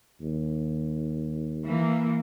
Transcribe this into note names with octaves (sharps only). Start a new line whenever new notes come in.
D#2
E3 A#3